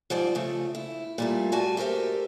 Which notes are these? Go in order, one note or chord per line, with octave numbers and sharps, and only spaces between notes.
G#2 F3 G3 C5 D5
C#3 F3 A3
E4
A#2 G3 A3
G3 F#4 G#5 A5
G4 A4 A#4 C5 E5